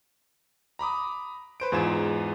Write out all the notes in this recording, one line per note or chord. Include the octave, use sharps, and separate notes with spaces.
A#5 B5 D6 D#6
B4 C5 D7
E2 G#2 F4 A#5 G#6 E7